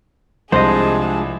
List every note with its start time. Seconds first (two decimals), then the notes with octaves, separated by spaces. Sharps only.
0.52 C2 F3 G#3 D4 G#4 C5 D#5 A5